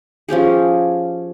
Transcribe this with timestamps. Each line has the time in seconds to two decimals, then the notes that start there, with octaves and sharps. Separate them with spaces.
0.29 F3 C#4 G4 G#4